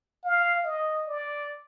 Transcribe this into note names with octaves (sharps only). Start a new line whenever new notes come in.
F5
D#5
D5